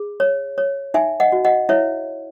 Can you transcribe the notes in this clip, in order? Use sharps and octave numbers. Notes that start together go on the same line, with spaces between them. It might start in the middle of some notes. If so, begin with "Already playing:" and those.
Already playing: G#4
C#5
C#5
D#4 E5 G#5
D#5 F#5
F#4
D#5 F#5
E4 C#5 E5